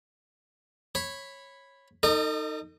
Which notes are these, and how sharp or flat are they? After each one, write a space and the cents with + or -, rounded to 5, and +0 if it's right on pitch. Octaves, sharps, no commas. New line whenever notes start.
C#5 -15 B5 +0
D#4 +0 A4 +40 D#5 -35